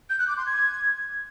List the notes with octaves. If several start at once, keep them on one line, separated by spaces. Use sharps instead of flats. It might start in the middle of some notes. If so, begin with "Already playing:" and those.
G6
F#6
D6
C6
G#6